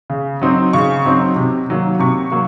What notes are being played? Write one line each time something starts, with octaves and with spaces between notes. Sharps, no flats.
C#3
F#3 C4 D#4
C#3 C#6
F#3 C4 D#4
C3
D#3 F#3 A#3
C3 C#6
F#3 A#3